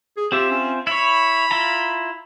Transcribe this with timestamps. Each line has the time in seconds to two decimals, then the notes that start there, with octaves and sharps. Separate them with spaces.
0.17 G#4
0.32 C4 F4 G4 E5
0.51 C#4
0.87 E4 C#5 B5
1.51 E4 F4 A#5